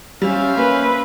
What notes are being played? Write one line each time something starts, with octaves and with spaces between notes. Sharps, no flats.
G3 C#4 C5 E5 F5
A#3 C#4 B4